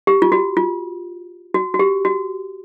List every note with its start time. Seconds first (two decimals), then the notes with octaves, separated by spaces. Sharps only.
0.07 G4
0.22 F4
0.32 F#4
0.57 F4
1.54 F#4
1.74 F#4
1.79 G4
2.05 F#4